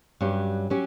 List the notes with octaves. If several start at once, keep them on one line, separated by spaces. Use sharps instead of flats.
G2 F#3 C#4 G4
F#3 C#4 G4